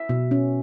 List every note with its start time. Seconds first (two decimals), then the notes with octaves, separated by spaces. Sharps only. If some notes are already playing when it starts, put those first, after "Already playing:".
Already playing: E5
0.09 B2
0.31 C#4